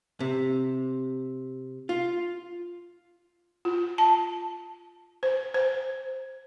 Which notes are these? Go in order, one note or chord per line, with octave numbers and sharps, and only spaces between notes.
C3
F4
F4
A5
C5
C5